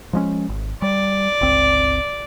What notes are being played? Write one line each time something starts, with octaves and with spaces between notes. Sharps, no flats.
F3 G#3 C#4
G#1
G3 D5
G1 C#2 C4